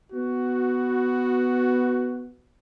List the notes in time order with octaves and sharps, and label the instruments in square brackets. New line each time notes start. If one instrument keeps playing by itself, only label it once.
[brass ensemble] B3 F#4